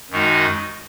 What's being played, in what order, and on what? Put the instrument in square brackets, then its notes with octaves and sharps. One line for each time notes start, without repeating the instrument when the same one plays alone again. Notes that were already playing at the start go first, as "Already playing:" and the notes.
[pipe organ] F#2 D#3 G#3 D#4 F#4